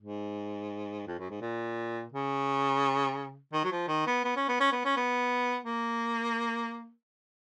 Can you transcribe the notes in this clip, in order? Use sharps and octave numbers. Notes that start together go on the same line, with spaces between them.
G#2
F2
F#2
G#2
A#2
C#3
D#3
F#3
F3
D#3
B3
B3
C#4
B3
C#4
B3
C#4
B3
A#3